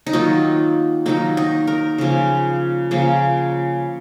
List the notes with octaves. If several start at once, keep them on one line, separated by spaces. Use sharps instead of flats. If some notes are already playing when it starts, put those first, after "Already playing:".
D#4
D#3 F#3 A#3 F4
D#3 F#3 A#3 D#4
D#4
A#4
C#3 F3 A#3
C#3 F3 A#3